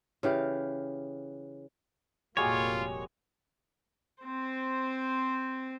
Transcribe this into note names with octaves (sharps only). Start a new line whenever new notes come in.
C#3 E3 G4 F5
F1 A#2 G3 G#3 A#3 F4 F#4 C#5
C4 C5